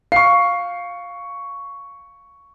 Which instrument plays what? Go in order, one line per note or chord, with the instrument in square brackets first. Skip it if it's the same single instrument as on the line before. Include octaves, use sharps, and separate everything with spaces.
[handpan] F5 [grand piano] C#6 C7